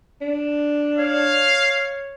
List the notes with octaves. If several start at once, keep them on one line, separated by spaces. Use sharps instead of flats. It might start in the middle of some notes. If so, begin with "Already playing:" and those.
D4
C#5 F5